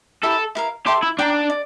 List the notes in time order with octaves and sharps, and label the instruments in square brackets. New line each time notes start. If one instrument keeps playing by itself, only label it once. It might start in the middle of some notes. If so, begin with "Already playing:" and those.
[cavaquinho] E4 G4 A#4 [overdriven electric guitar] A4
[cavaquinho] E4 A#4 F5
[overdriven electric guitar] G4 [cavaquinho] A4 E5 A5 C6
[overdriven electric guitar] E4
[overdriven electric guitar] D4 [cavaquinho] D5 G5 A#5
[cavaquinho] D5